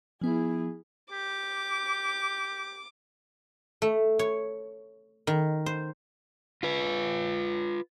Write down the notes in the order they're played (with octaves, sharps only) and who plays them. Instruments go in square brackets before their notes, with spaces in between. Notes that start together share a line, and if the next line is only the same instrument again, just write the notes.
[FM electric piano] F3 B3 [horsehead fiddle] E4 G#4
[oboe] G4 [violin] D6
[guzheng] A3
C#5
D#3
C5
[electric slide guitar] F4 B4